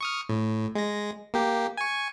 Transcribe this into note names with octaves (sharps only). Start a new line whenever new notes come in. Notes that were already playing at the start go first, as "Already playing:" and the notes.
C#6 D#6 F6
A2
G#3 A#6
A#3 G4
G#5 C#6